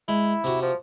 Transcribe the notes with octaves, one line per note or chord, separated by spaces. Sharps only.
G#3 E4
C3 F#4
F3